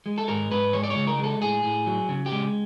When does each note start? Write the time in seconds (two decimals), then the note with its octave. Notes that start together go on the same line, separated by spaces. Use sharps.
0.06 G#3
0.18 A4
0.28 G#2 A#4
0.51 G#2 B4
0.73 G#3 C#5
0.83 D5
0.90 C#5
0.96 C#3
1.07 A#4
1.19 G#3 A4
1.42 A2 G#4
1.63 A2
1.87 F#3
2.09 C#3
2.26 G4
2.32 G#3